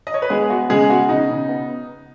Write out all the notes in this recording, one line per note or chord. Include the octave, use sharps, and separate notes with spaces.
D#5
C#5
B4
G#3 B3 G#4
B3 F#4
C#3 G#3 G#4
B3 F#4
C#3 D#4
C#3
B3